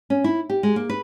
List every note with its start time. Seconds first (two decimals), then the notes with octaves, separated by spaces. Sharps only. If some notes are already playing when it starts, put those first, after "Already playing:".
0.10 C#4
0.24 E4
0.50 G4
0.63 G#3
0.76 A#3
0.89 B4